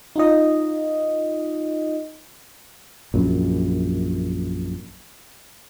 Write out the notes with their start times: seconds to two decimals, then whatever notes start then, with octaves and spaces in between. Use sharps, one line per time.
0.16 D#4 F4 D#5
3.14 A#1 F#2